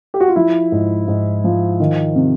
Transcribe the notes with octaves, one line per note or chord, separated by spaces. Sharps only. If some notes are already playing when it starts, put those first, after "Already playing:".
G4
F#4
F4
F3 E4
G#2
G#2
F3
D#3
C3